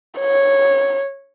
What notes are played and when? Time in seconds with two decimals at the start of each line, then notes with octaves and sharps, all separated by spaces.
0.20 C#5